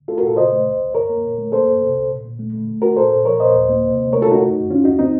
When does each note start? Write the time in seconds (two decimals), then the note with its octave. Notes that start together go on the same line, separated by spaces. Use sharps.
0.08 A3 F4 A4
0.17 F#4 A#4
0.23 A#2 F4 A4
0.36 C#3 C5 D#5
0.52 A3
0.66 C#2
0.81 C#2
0.94 F#2 A#4 C#5
1.09 A#3
1.24 A#2
1.38 A3
1.52 A#3 A4 C5
1.67 F#2
1.81 C3
1.96 C2
2.10 A#2
2.25 A#2
2.39 A3
2.53 A3
2.68 A3
2.82 A3 F#4 A#4
2.97 A#2 A4 C5
3.11 A#2
3.25 F3 A#4 C#5
3.40 A#2 C5 D#5
3.55 D#2
3.70 A#3
3.84 C3
3.97 C3
4.13 A3 A#4 C#5
4.22 F4 A4
4.26 A3
4.31 D#4 F#4
4.40 F#2
4.56 F#2
4.70 D#3 C#4 F4
4.84 D#2 D#4 F#4
4.99 D#3 C4 D#4